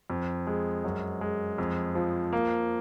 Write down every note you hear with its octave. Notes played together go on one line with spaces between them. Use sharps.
F2
G#3
F#2
G#3
F2
F3
A#3